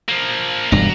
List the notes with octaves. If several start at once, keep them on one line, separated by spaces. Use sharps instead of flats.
F3 A#3
E1 G2 G3 F#4 A#5